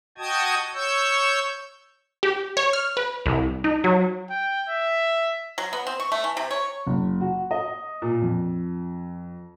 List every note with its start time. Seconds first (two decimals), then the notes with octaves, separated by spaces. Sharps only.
0.18 F#4 D#5 G5 A5 D#6 G#6
0.74 C#5 C#6 E6 G6
2.23 G4
2.57 C#5
2.73 F6
2.97 B4
3.26 C2
3.64 D#4
3.84 F#3
4.30 G5
4.69 E5
5.58 F#3
5.73 B3
5.87 C4
6.00 C#6
6.12 A3
6.24 E3
6.37 C3
6.51 C#5
6.87 F#1
7.21 F#4
7.51 D#5
8.02 A#2
8.22 F2